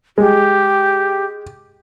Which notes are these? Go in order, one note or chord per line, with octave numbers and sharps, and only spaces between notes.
G#3 G4